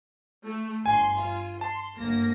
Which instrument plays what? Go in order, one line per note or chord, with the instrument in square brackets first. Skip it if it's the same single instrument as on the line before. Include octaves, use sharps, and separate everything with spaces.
[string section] A3
[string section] G1 C6 [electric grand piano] G#5
[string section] F4
[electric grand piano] A5 [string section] C6
[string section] G1 A#3 A#6